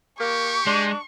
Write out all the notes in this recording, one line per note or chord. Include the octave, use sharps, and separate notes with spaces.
A#3 G4 C#6
G#3 D4